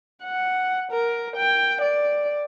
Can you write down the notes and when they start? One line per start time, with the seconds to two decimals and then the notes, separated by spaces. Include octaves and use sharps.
0.24 F#5
0.92 A#4
1.36 G5
1.82 D5